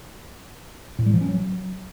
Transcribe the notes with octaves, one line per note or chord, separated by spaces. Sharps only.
A2
G3
F3
C#4
F#3